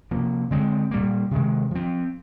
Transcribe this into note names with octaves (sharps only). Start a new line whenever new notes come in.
C3 F3 A#3
D3 G#3 C4
A#2 G3 A#3
C3 D#3 G#3
F3 C4